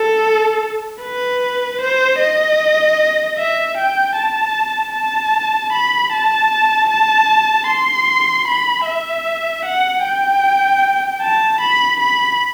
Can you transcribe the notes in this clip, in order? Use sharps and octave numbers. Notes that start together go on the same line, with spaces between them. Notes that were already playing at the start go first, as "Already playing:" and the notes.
Already playing: A4
B4
C5
D#5
E5
G5
A5
A5
B5
A5
A5
C6
B5
E5
F#5
G5
A5
B5
B5